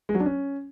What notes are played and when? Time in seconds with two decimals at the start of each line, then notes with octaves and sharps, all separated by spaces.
0.09 G#3
0.15 F#3
0.20 D4
0.26 C#4